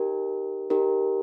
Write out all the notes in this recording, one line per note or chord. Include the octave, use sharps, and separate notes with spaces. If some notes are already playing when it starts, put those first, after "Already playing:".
Already playing: D#4 G4 A#4
D#4 G4 A#4